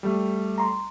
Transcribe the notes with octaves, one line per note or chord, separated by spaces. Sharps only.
G3 A3
A#5 C6